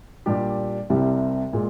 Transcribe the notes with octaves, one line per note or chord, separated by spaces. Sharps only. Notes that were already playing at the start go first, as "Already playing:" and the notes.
A#2 G3 D4 G4
C2 C3 G3
A#2 G#3